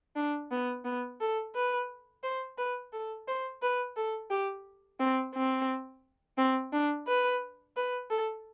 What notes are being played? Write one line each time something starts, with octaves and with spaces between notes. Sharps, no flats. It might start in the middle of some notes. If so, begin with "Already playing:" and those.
D4
B3
B3
A4
B4
C5
B4
A4
C5
B4
A4
G4
C4
C4
C4
D4
B4
B4
A4